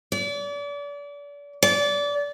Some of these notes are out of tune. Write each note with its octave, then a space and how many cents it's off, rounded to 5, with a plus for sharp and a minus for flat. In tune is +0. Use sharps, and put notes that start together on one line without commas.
D5 -35
D5 -25